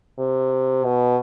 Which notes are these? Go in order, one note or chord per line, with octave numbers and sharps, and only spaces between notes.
C3
B2